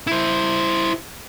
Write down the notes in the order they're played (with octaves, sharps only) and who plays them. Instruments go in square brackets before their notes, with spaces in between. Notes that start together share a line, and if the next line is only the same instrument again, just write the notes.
[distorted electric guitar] E4 C5